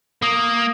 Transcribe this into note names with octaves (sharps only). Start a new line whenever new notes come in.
A#3 D#6